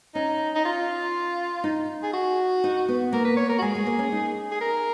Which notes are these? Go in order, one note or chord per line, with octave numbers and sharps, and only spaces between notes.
C#4 D#4
D#4
F4
D#4
G#4
F#4
D#4
B3
A#3 A#4
B4
C#5
A#4
F#4
G#3 G#4
G#3
A#3
C#4
D#4
G#4
A#4